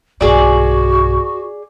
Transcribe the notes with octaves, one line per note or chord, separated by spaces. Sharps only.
B1 G2 F#4 G#4 D5